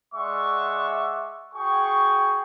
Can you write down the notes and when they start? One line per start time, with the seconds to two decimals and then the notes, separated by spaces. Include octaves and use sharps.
0.14 G#3 D5 E5 F#5 C#6
1.54 F#4 G#4 G5 C#6